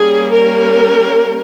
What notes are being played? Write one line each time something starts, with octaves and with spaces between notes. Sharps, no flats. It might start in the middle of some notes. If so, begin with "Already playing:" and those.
Already playing: G3 A#3 C#4 G#4
A#4